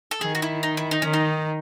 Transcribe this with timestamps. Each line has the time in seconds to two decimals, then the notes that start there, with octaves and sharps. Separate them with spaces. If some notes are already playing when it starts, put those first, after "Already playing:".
0.11 A4
0.21 D#3 G#4
0.35 F#4
0.42 E4
0.63 D#4
0.77 E4
0.91 D#4
1.02 D#3 C#4
1.13 D#4